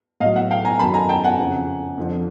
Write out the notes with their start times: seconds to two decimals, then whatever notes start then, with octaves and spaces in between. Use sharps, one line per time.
0.20 A2 D#5 F5
0.25 F#3
0.36 E5 F#5
0.51 F5 G5
0.65 G#5 A#5
0.79 F#2 D#3 F#3 A5 B5
0.94 G#5 A#5
1.09 G5 A5
1.24 F#5 G#5
1.38 F2 C#3 F3
1.98 F2 D3 F3